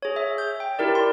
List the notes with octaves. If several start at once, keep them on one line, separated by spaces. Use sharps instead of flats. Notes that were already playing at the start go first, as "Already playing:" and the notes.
G#4 C#5
E5
G6
G5
E4 G4 A#4 D5
C6